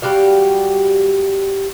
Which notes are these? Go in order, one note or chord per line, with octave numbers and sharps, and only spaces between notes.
G3 F#4 G4 F5